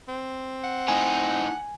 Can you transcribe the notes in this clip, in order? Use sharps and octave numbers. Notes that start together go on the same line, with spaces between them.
C4
F#5
A2 D#4 G#5